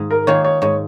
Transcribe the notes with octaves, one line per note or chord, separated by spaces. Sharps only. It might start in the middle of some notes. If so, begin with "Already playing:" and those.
Already playing: G#2 D#3 A#3
A#4
D#3 A#3 F4 G#4 C#5
C#5
G#2 C#5